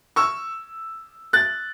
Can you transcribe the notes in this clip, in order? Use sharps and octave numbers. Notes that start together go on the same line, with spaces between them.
C#6 E6
F#6 A6